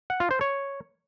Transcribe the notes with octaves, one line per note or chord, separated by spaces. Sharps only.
F#5
F4
C5
C#5